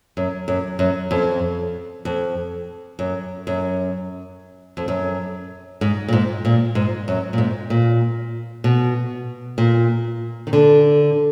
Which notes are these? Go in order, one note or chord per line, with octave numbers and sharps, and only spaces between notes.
F#2
F#2
F#2
F2
F2
F#2
F#2
F2
F#2
G#2
A#2
G#2
A#2
G#2
F#2
A#2
G#2
A#2
B2
A#2
D#3
D3